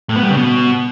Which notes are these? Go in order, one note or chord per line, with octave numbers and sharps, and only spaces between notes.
A2
B3
G3
C#3
B2